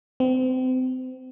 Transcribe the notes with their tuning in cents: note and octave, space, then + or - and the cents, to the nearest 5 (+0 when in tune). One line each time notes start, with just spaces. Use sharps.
C4 -30